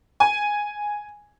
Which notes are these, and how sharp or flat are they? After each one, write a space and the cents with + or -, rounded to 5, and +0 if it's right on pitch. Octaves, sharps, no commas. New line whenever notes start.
G#5 +0